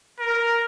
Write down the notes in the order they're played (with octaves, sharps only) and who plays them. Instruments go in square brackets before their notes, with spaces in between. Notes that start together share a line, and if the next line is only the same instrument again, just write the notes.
[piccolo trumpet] A#4